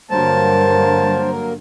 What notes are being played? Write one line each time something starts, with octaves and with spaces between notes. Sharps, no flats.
G2 D3 F#3 A#3 A#4 C5 A5